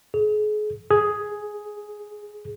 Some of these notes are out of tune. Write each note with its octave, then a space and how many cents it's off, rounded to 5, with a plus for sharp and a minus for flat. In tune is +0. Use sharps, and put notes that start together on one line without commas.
G#4 +35
G#4 +5